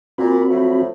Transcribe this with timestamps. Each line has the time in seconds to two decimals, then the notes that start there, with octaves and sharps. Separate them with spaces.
0.18 A#2 C4 F#4 B5
0.50 F3 F#3 A3